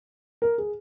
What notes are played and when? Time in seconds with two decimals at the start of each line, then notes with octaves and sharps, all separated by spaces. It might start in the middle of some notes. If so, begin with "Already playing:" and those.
0.42 A#4
0.58 G#4